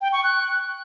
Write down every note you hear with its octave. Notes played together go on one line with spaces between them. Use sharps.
G5
C#6
F#6